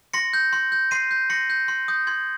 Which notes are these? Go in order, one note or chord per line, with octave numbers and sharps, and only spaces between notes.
C6 A#6 C#7
G6
C6
G6
C6 C7 D#7
G6
C6 A#6 C#7
G6
C6
D#6 G6
C6 G#6